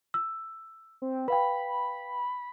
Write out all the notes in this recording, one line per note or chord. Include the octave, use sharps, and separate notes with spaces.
E6
C4
B4 F5 G5 B5